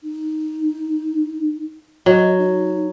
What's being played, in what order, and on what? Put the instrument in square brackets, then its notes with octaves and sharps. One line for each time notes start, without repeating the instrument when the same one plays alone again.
[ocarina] D#4
[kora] F#3 [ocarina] D#5
[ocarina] D#4